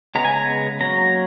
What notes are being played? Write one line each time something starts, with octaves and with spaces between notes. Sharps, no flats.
C#3 G#3 B3 A#5
G#5
A#5
F#3 A#3 C#4 A#5